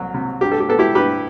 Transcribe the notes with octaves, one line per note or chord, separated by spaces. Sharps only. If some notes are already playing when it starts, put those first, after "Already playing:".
Already playing: C2 F#3
C3
G2 G4
A4
G4
B3 A4
E4 G4
G2 G4 B4